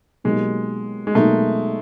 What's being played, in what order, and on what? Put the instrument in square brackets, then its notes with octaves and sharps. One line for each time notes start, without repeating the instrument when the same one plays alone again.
[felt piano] B2 F#3 A#3 D#4 G4 [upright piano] G#3
[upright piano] G#3
[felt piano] B2 F#3 A#3 D#4 [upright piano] A3